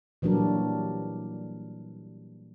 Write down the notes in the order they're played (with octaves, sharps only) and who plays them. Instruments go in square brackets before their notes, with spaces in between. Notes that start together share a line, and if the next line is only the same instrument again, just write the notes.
[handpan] A#2 E3 F#3 G3 D4 A#4